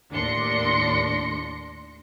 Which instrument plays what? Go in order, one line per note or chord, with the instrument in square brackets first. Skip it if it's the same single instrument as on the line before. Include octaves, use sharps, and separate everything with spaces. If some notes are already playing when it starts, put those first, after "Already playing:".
[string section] D#2 A2 D4 C6 A#6 C#7